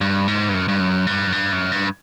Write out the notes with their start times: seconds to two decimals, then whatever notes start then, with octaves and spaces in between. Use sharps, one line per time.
0.01 G2
0.28 G#2
0.49 G2
0.54 F#2
0.68 G2
0.80 F#2
1.07 G2
1.27 F#2
1.32 G2
1.52 F#2
1.72 G2